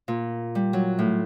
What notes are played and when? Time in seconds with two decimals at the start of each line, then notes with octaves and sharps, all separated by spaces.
0.08 A#2
0.55 G3
0.73 F#3
0.99 A2